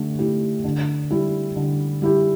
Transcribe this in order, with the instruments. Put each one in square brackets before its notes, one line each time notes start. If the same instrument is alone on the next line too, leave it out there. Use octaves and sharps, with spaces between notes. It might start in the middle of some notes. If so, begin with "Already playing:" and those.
Already playing: [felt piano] D3 A3 G4
A3 E4 G4
D3
G3 E4 G4
D3
G3 E4 G4